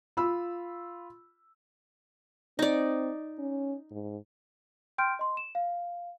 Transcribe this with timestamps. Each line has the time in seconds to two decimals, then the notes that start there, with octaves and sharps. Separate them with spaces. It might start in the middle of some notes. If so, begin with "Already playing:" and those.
0.17 F4 B5 E6
2.59 C4 D#4 D5
3.39 C#4
3.91 G#2
4.98 G5 C6 F6 G6 D7
5.19 D#5 C6
5.37 E7
5.55 F5